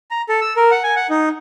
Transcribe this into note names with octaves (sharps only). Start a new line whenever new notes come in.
A#5
A4
E6
A#4
F#5
G#5
F#5
D#4